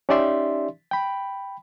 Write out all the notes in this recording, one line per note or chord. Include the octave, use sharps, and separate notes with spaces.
C#4 D#4 G4 D5 E5 C6
G5 B5